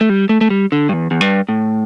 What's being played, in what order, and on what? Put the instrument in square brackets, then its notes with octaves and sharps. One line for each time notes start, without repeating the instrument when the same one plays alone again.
[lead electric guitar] A3
G3
A3
A3
G3
D3
G2
E2
E2
G2
A2